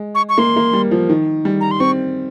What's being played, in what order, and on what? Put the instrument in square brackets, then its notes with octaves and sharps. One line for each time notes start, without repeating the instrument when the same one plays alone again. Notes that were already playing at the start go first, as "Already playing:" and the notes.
Already playing: [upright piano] G#3
[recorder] C#6
C#6
[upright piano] A#3 [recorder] C6
[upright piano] A#3
G3
F3
D#3
G3
[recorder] A#5
C6
[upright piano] C4 [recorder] C#6